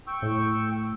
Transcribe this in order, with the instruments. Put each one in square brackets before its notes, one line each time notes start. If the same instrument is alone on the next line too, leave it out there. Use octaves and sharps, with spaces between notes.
[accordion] G5 C#6 E6
[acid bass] A2